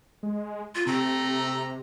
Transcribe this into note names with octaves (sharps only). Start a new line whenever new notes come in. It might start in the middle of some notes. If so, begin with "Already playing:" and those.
G#3
F4
C3 A3 C4 A#5